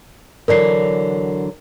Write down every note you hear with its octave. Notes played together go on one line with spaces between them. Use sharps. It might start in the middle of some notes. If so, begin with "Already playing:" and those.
D3 E3 F#3 A#4 D5 C7